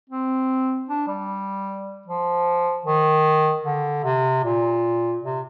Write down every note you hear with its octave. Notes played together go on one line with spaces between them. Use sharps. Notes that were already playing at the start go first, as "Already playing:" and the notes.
C4
D4
G3
F3
D#3
D3
C3
A#2
C3